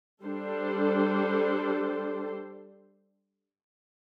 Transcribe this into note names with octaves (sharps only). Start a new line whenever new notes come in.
G3 D4 A4 C5